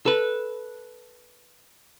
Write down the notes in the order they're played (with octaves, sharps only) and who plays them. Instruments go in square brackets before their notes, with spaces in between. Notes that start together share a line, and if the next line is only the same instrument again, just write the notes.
[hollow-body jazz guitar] A4 B4